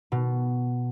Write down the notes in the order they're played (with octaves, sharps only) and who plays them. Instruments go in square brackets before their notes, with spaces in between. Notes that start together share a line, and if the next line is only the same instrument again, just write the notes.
[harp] B2